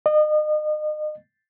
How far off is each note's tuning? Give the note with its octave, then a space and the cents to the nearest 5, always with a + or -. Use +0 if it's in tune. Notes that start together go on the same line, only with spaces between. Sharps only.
D#5 -35